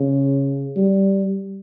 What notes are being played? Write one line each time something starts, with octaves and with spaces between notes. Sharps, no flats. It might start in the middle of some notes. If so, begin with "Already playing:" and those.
Already playing: C#3
G3